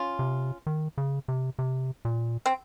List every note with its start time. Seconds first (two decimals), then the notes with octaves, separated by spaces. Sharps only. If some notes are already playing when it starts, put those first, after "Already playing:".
Already playing: C#4 F4
0.19 C3
0.67 D#3
0.98 C#3
1.28 C3
1.59 C3
2.05 A#2
2.46 C4